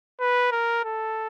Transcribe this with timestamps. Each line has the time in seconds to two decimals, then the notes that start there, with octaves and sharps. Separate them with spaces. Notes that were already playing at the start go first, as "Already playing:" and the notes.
0.20 B4
0.52 A#4
0.85 A4